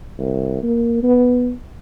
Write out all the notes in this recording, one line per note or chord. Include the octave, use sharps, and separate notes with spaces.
C2
A#3
B3